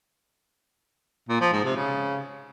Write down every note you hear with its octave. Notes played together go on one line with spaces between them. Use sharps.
A#2
F3
G#2
C3
C#3